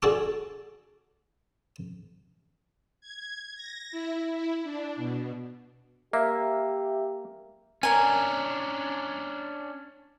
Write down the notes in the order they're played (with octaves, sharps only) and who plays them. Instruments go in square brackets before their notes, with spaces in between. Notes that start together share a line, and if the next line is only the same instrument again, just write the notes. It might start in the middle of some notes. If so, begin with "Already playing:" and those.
[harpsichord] D4 F#4 G#4 A4 A5 D6
[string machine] G#6
A#6
E4
E4
D4
B2
[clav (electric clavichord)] A#3 [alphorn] G4 [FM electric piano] E5
[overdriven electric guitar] C#4 D4 [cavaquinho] A#4 G#5